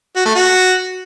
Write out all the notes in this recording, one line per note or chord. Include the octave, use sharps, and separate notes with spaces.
F#4
A3
F#4